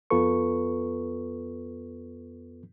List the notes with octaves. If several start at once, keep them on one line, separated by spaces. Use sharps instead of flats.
F2 B3 F4 A4 B4 C#6